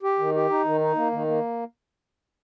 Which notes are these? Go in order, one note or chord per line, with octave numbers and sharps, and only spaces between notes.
G4
D#3
G4
D#4
D#3
D#4
A#3
D#3
A#3